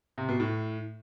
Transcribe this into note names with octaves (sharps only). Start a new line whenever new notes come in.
C3
B2
A2